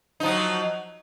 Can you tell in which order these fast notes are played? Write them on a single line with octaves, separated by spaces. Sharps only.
D#4 F3 F#3